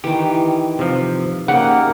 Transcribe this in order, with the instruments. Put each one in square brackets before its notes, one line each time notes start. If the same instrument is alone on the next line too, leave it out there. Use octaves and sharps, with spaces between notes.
[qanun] D#3 E3 [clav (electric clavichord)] G4
[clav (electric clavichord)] C3 F3
[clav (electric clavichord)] C#3 G4 [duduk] A#3 [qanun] D#4 [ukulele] F#5